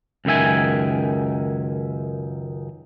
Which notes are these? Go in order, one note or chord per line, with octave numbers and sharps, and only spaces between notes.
C#2 F#2 D#3 E5 G#5